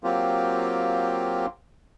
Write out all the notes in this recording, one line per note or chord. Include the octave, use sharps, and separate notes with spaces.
F#3 A#3 C4 F4 G4